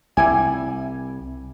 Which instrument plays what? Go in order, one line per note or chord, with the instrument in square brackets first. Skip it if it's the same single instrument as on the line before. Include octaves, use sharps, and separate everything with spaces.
[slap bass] C2 [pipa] G3 E4 G#5